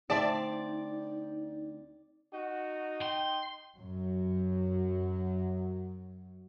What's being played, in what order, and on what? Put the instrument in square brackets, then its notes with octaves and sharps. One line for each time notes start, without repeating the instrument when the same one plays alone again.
[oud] D2 C4 [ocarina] D#4 [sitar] D5 [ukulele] E5 A5
[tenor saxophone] D#4 [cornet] F#4
[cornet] G5 [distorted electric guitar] C6
[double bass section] F#2 F#3